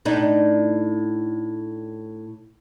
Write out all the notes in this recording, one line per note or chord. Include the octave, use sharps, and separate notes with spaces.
A2 D4 D#4